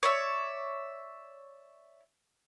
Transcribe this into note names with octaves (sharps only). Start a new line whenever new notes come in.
C#5 D5 E5